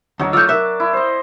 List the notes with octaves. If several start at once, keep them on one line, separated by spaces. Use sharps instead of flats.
D2 F#3 D#4 C#5
A3 F4 D5 E6 F6 G6
A#4 E5 F#6
E4
C5 D#5